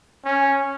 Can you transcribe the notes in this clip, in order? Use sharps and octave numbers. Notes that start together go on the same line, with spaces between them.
C#4